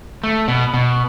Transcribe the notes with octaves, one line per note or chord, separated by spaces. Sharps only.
A3
B2
B2